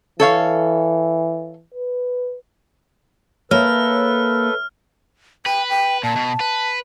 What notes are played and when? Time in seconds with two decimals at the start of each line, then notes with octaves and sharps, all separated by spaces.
0.20 E3 A4 C#5 F5
1.74 B4
3.51 A#3 A4 B4 C#5 E5 F6
5.46 B4 G5
5.70 G5
6.03 A#2 A5
6.16 B2
6.40 B4